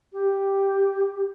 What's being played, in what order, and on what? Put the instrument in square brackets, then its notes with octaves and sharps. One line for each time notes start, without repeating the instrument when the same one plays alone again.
[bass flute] G4